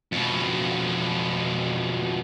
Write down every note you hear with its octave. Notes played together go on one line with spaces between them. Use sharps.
F2 B2